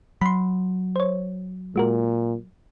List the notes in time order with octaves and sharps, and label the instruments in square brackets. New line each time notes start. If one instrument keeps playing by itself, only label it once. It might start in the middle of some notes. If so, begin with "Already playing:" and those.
[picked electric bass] F#3 [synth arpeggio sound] B5 C6
[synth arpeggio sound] C5 C#5
[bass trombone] A#2 [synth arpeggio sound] G#3 F#4 A#4